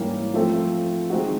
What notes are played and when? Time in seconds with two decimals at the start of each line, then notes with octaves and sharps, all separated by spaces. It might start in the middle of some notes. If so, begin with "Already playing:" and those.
Already playing: G#2 E3 G3 A#3 C#4
0.34 F3 A3 C4
1.10 D#3 G#3 C4 D#4 F#4